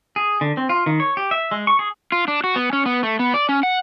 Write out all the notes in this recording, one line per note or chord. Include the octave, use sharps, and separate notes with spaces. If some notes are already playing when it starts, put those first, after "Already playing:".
G#4
D3
C4
F4
D#3
C#5
G4
E5
G#3
C#6
G#4
F4
D4
F#4
B3
C#4
B3
A3
B3
D5
C#4
F#5